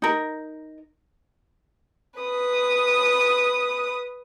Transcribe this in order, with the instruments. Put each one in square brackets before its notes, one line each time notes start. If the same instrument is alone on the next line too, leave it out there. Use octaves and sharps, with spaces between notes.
[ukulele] D#4 A#4
[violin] B4 D#6